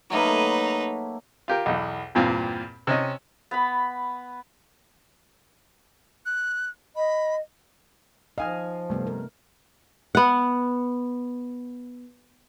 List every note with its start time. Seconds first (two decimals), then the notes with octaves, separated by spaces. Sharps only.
0.10 F#3 A3 A#3 D#4 B4
1.48 F4 G4 A#4
1.66 B1 E2
2.15 E2 G2 A#2 C4
2.87 C3 C#4 D#5
3.51 B3 B5
6.26 F#6
6.96 D#5 B5
8.38 F3 D#4 D#5 F5 G#5 F6
8.90 G2 C3 A3 B3
9.07 A#4
10.15 B3 F#5